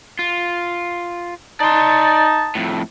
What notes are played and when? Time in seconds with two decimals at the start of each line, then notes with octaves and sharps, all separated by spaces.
0.19 F4
1.60 D#4 D5 A5 C6
2.55 F2 A2